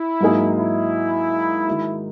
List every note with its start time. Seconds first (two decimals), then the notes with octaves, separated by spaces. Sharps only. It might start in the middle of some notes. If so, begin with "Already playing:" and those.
Already playing: E4
0.21 G#2 F#3 A#3 D#4 G#4
0.57 E4
1.67 D#3 G#3 D#4 F#4